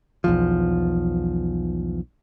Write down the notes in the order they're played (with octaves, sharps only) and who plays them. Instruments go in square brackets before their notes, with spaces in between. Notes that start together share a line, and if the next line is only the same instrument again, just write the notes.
[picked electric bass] B1 E2 F3